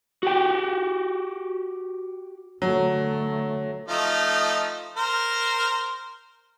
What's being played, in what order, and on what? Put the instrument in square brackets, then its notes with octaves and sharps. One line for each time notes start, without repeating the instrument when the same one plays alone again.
[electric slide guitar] F#4 G4 G5
[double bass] D3 A3 [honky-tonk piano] F#3
[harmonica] F3 A3 D#4
A#4 C5